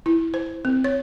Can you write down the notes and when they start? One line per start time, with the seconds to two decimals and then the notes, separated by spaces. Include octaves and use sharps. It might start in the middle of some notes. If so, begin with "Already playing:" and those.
0.06 E4
0.34 C5
0.65 C4
0.84 C#5